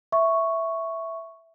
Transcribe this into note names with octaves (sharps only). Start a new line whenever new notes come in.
E5 C#6